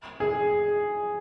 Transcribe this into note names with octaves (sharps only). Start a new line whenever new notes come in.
G#4